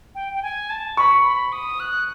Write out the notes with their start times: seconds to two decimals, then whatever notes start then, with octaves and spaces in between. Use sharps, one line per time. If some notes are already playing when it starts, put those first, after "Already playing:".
0.15 G5
0.34 G5
0.42 G#5
0.70 A5
0.97 B5 C#6
1.24 B5
1.52 D#6
1.80 F#6